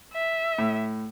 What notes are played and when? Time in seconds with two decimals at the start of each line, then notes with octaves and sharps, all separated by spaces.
0.13 E5
0.58 A2